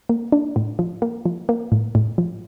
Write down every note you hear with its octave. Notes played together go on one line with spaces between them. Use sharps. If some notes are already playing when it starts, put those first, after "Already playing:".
A#3
D4
A2
F3
A#3
F3
A#3
A2
A2
F3